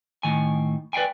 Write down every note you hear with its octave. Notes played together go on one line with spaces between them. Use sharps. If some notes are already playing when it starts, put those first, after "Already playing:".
A2 D#3 G#5
B4 D5 F5 G5 G#5